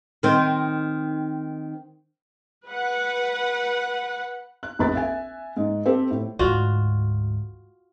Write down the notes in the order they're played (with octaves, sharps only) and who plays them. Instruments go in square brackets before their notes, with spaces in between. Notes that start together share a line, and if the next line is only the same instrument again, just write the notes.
[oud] D#3 C4
[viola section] B4 F#5
[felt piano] F#6
F1 A#1 B4 B5 F#6 A6
E5 G#5
G#2
C4 G4 A4
A2
[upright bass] D2 G#2 [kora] F4 F#4